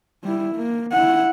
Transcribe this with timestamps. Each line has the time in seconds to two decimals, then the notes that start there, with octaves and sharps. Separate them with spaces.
0.24 G3 E4
0.56 A#3
0.92 E4 F#5